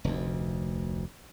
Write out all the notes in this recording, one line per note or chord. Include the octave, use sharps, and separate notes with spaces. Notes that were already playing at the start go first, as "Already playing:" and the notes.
F1 D2